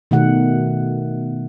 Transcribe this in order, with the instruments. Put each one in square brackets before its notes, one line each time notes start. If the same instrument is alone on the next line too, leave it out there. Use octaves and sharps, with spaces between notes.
[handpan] B2 D#3 A3 F#5